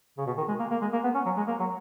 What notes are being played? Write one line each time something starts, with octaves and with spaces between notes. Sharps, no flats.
C#3
B2
D#3
G#3
A#3
A#3
G#3
A#3
B3
C#4
F#3
G#3
A#3
F#3